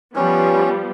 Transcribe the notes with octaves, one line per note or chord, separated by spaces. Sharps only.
F3 G3 B3 C#4